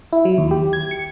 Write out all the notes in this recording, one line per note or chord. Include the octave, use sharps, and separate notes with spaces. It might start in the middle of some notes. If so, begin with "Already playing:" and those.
E4
F#3
D#2
G4
G#6
C#7